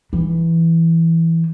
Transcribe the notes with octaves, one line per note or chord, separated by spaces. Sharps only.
E3